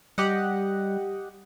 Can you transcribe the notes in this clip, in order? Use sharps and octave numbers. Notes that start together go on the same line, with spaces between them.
G3 G4 D#5 F#5